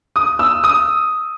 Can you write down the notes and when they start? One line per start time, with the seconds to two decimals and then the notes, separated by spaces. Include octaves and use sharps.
0.16 D#6
0.39 E6
0.64 D#6